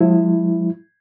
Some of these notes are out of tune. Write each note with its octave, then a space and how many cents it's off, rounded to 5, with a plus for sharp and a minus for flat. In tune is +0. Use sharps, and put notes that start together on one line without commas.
F3 +35 G#3 -15 E4 +0